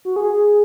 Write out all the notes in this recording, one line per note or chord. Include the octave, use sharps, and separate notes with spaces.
F#4
G#4